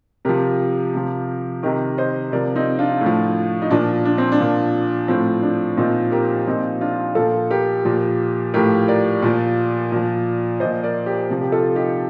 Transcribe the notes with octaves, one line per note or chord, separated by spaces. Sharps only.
C3 F3 G4 A#4
C3 F3
C3 D#3 G4 A#4
C5 D#5
C3 F3 A#4 D5
C4 D#4
D4 F4
A2
F3
D#4
A#2 F3 D4
D4
C4
D4
A#2 F3
A2 F3 C4
D4
A#2 F3 C4 D#4
G4 A#4
A#2 F3 C4 D#4
D4 F4
A#2 F3 F4 A4
G4 A#4
A#2 F3
A2 F3 G4 A#4
A#4 D5
A#2 F3
A#2 F3
A#2 F3 C5 D#5
A#4 D5
G4 A#4
C3 F3
G4
F4 A4
D#4 G4